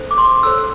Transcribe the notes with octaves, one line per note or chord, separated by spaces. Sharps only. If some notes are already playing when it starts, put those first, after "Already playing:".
Already playing: D4 A4 C5
D6
C6
D4 A4 C5 E6